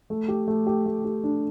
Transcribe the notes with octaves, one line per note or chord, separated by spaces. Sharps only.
A3
G4
A3
G4
A3
G4
D4